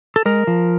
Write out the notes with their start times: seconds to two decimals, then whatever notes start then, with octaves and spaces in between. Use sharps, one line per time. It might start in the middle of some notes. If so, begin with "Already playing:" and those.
0.16 A4
0.25 G#3 A#4
0.47 F3